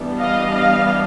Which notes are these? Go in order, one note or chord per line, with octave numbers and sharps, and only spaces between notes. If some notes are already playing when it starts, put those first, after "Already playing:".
Already playing: E3 G3 B3 D4
D#5 F5
D#5 F5